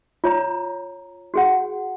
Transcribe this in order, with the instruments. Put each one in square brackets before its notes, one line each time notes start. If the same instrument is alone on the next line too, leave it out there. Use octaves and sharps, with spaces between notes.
[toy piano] F4 C#5 A#5
F#4 G#4 F#5